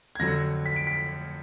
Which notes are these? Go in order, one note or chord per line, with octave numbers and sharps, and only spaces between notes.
G#6
F2 D3 F#3 A#6
B6
D7
B6